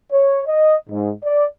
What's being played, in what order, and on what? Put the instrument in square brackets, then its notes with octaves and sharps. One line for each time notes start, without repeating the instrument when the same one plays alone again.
[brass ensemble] C#5
D#5
G#2
D5